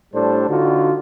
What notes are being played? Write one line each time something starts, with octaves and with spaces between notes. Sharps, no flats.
A2 G3 D4 A4 C5
D3 D#4 F4 F#4